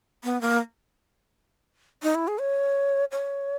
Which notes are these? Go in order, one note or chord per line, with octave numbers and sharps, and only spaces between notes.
B3
A#3
D#4
E4
G#4
C#5
C#5